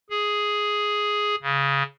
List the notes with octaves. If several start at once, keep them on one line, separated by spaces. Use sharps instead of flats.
G#4
C#3